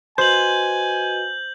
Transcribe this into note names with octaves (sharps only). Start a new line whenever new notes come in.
F#4 B4 C5 D#5 G#5 G6 F#7